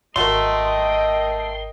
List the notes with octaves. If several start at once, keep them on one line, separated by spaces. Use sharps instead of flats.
G#1 A3 F#4 A#4 D#5 G5 C6